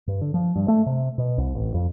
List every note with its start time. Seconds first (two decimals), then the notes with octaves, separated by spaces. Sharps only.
0.07 G2
0.21 D3
0.34 F3
0.56 G2
0.68 A3
0.86 C3
1.18 B2
1.38 C2
1.55 A1
1.74 F2